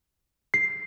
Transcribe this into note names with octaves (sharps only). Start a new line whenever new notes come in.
C7